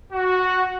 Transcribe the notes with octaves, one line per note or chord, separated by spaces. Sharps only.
F#4